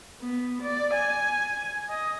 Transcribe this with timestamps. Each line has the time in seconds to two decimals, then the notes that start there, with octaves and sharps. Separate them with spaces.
0.21 B3
0.62 D5
0.94 G#5
1.90 D#5